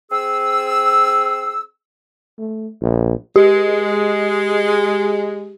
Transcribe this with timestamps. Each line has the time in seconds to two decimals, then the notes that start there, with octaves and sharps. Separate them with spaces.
0.11 C4 G#4 E6
2.39 A3
2.82 A#1
3.36 G#3 G4